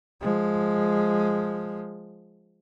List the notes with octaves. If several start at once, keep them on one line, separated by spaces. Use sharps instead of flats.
F3 G#3